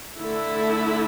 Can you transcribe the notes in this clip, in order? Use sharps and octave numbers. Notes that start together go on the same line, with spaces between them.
D3 A3 E4 A4